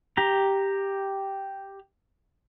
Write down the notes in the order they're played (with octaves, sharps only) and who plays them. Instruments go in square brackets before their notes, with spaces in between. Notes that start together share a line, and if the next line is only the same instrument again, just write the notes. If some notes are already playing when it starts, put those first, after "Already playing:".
[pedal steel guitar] G4 A#5